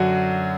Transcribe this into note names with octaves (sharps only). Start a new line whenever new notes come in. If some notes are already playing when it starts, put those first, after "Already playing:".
Already playing: F#2 D3 F#3 F#4